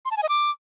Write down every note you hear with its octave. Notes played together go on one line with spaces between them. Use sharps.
C6
A5
G#5
D#5
D6